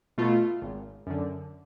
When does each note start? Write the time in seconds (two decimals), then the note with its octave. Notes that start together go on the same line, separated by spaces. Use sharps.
0.18 B2 A3 F4
0.62 G#1
1.07 F#2 D3